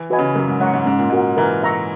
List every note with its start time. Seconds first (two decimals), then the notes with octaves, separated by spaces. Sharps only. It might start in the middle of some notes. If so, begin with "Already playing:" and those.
Already playing: E3
0.10 F#4 B4 D#5 G#5
0.19 C#3
0.35 F#2 A#4
0.48 G#2
0.60 G#2 C#5 F#5 A#5 C#6
0.73 G#2
0.86 G#2 C#4
0.98 A#2
1.10 G#2 F#4 A#4
1.37 E3 A#4
1.63 E5 A#5 C#6